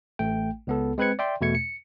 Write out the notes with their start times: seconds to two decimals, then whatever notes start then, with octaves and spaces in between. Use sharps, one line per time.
0.19 A1 A3 G5
0.67 C#2 B3 A4
0.98 G#3 C4 B4 F#6 G#6 C#7
1.19 D5 E5 G5 C6
1.41 E2 B2 A3 G#6 C#7
1.55 C#7